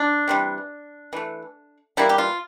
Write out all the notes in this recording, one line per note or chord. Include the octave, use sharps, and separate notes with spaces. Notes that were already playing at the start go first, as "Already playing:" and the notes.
Already playing: D4
C3 E3 G3
E3 A3
E3 G3 A#3 E4
G4
F4